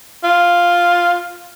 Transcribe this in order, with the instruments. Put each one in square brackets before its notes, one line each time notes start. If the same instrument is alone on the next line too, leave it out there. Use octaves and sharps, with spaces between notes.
[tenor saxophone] F4